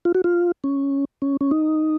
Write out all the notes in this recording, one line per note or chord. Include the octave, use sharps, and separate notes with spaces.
F4
F#4
F4
C#4
C#4
C#4
D#4